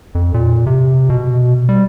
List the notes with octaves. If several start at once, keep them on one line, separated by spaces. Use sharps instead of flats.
F2
A#2
C3
B2
G3